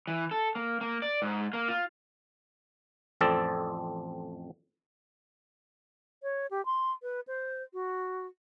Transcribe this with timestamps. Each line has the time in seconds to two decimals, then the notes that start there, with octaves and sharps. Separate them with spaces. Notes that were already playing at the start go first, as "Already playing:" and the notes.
0.07 E3
0.31 A4
0.55 A#3
0.81 A#3
1.02 D5
1.22 G#2
1.53 A#3
1.68 F4
3.21 A1 F2 C4 A4 D5
6.23 C#5
6.51 G4
6.66 C6
7.02 B4
7.27 C5
7.73 F#4